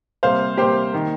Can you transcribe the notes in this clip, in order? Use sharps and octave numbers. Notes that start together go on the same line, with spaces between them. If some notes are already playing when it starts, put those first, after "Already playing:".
C3 G3 A#3 C5 F5
C3 G3 A#3 G4 C5
D#3 A#3